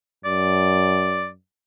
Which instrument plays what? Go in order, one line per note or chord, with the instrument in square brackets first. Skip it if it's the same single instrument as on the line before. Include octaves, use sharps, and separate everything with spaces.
[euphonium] F#2 [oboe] D5